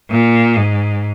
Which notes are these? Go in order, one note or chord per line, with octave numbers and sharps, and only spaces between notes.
A#2
G#2